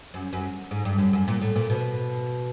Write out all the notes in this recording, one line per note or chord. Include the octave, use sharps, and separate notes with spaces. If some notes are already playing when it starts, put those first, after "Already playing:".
F#2
F#2
G#2
G2
F#2
F#2
A#2
A2
A#2
B2